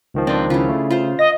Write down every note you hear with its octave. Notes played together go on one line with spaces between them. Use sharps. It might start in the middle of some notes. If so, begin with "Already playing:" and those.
C#2 D#3 F3
C4 D4 F4 D5
C#3 E4 F4
A3
F4 C5
D#5 A#6